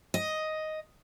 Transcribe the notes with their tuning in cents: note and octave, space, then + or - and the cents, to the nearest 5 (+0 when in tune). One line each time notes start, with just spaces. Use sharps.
D#5 +5